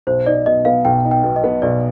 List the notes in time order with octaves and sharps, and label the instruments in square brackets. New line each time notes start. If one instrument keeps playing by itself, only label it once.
[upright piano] B1 [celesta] C5
[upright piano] D#4 [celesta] D5
[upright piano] B2 [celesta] D#5
[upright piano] B3 [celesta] F5
[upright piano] B1 [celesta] G5
[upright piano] D#4
[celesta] G5
[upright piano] B2
[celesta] D#5
[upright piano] B3
[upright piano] B1 [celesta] D5